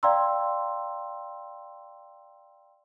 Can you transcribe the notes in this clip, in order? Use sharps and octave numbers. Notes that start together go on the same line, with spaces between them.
D5 F5 G5 A#5 C6 E6